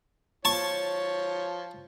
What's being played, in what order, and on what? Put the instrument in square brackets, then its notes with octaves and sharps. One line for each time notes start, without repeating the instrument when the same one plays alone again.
[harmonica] F3 C#5 [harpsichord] A5 C#6